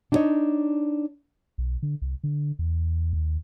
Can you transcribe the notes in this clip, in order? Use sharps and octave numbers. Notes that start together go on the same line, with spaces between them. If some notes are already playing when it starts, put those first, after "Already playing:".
D4 D#4 F#4 C5 C#5 D#5
B1
D3
C2
D3
E2
D#2